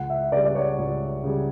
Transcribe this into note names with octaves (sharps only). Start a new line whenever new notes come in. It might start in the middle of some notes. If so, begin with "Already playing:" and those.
Already playing: C#2 F#5
E5
C#3 G3 D5
D5
C#5
C#2
C#3 G3